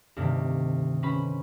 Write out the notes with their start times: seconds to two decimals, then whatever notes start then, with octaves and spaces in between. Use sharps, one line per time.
0.16 D2 G2 C3 D#3
1.03 C#4 B4 C5 B5